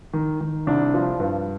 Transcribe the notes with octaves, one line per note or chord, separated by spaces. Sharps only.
D#3
D#3
C2 D4
F3
G2